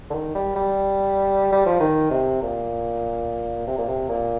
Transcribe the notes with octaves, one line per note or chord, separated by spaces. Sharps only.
D3
D#3
G3
G3
G3
F3
D#3
C3
A#2
C3
A#2
C3
A#2